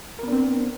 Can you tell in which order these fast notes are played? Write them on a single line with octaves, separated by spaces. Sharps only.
A#4 B3 D4 C4